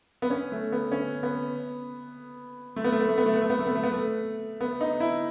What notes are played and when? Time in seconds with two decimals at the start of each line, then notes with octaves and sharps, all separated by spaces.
0.22 B3
0.30 C#4
0.52 A3
0.72 B3
0.92 C#4
1.23 B3
2.76 A3
2.84 B3
2.92 A3
3.01 B3
3.09 A3
3.18 B3
3.26 A3
3.34 B3
3.42 A3
3.50 B3
3.59 A3
3.67 B3
3.75 A3
3.83 B3
3.92 A3
4.61 B3
4.81 D#4
5.00 E4